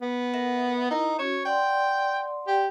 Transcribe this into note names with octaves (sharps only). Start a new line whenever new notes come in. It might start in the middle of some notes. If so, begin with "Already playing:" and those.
B3
A#4 E5 F#5
D#4 E4 A#4
C#4 F#4 C#5
D5 F#5 G5 C6
G4